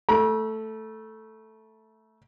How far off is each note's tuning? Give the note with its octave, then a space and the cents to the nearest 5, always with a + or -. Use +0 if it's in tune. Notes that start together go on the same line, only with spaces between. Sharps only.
A3 +0 B5 -45